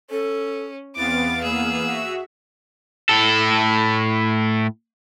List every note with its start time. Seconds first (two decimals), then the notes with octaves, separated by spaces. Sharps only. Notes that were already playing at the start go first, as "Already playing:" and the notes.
0.10 C#4 A4
0.96 E2 B3 C4 F5 D6 A6
1.43 A#3 G#4 E6
1.87 F#4 E5
3.09 A2 A4